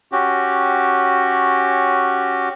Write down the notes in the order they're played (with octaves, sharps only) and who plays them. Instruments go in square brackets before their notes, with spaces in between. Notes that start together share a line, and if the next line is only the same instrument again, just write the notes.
[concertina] C#4 F#4 G4